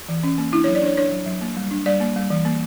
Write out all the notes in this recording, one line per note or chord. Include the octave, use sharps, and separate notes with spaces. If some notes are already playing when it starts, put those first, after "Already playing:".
E3
C#4
A#3
D4 E4
C#5
F#3
D5
D4 C#5
D4 C#5
F#3
F#3
A#3
G3
D4
G3 D5
A#3
G3
E3
A#3